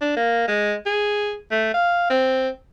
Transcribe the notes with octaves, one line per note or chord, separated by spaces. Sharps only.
D4
A#3
G#3
G#4
A3
F5
C4